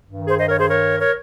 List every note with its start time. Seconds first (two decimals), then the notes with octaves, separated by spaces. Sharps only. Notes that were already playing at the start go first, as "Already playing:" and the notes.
0.08 G2 D#3
0.28 G#4 C5
0.38 C5 D#5
0.49 A#4 C#5
0.59 G#4 C5
0.69 A#4 C#5
1.00 A#4 C#5